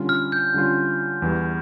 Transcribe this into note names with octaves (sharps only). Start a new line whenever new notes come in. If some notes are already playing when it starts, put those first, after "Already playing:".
Already playing: D3 G3 C#4 F4
F6
G6
D3 G3 C#4 F4
E2 E3 G3